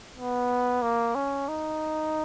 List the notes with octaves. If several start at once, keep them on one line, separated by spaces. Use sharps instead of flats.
B3
A#3
C#4
D#4